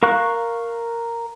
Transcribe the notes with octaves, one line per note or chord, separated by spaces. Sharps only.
A#4 F5 C#6 F#6